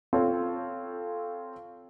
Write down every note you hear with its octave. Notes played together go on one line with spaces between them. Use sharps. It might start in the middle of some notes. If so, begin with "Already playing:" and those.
C4 F4 A4 C#5